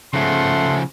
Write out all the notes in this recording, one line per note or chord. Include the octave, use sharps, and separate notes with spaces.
C#3 F3 A3 F#5 C6